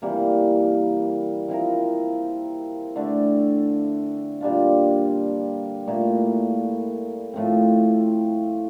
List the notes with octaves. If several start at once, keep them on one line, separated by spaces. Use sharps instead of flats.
C3 E3 G3 A#3
F3 C4 E4 A#4
D3 A3 D4
A#2 G3 D4 F4
A#2 A3 E4
A2 F3 A3 C4